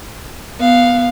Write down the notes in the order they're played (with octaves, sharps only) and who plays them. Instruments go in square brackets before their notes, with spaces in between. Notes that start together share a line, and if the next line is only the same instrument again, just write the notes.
[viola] B3 [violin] F5